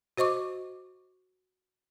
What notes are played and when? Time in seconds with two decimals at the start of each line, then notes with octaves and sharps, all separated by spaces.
0.17 F#4 C5 D#5 C#6 D6